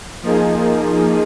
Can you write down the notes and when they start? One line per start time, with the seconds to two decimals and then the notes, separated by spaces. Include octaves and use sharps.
0.22 F3 A#3 D#4 G#4